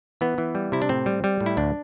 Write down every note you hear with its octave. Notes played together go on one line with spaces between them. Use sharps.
E3 B3
E3
G3
C3 E4
D4
A2 C4
G3
G3
A2
E4
D2 D4